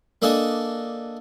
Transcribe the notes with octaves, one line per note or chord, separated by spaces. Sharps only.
A#3 D4 A4 D#5 G#5